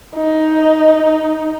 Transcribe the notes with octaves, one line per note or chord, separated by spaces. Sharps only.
D#4